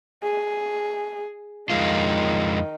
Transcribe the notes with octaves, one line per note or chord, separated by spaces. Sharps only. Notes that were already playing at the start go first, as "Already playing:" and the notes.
G#4
F2 D#3 G#3 F4